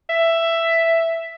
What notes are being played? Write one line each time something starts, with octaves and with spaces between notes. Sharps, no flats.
E5